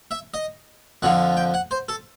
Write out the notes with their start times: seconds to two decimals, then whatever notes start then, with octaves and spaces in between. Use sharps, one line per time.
0.11 E5
0.34 D#5
1.02 F2 D3 F3 F#5
1.37 G5
1.54 F#5
1.71 C5
1.89 A4